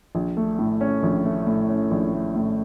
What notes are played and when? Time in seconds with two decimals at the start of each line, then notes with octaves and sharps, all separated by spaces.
0.15 A#1
0.37 A3
0.59 A2
0.81 C#4
1.03 A#1
1.25 A3
1.47 A2
1.69 C#4
1.91 A#1
2.14 A3
2.36 A2